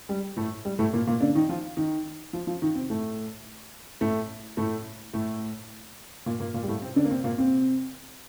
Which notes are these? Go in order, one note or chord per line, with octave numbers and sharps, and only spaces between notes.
G3
A2 A3
G3
A2 A3
A#2 A#3
A#2 A#3
D3 D4
D#3 D#4
F3 F4
D#3 D#4
F3 F4
F3 F4
D#3 D#4
C3 C4
A2 A3
A2 A3
A2 A3
A2 A3
A#2 A#3
A#2 A#3
A#2 A#3
G3
A2 A3
C3 C4
D3 D4
A#3
C3 C4
A#2 A#3
C3 C4